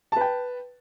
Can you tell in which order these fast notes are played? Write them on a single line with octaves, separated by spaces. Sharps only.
A5 B4 G5